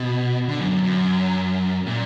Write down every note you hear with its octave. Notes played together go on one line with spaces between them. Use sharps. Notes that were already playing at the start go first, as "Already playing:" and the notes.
Already playing: B2
D3
F#2
F#2
F#2
A#2